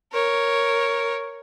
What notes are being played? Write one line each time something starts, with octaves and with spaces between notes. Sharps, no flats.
A#4 C#5